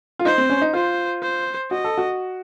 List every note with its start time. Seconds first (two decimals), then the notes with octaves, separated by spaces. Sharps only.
0.19 F4
0.25 D#4 C5
0.38 C4
0.50 C#4
0.62 D#4
0.73 F4 C5
1.22 C5
1.71 F#4 D#5
1.84 A4
1.98 F#4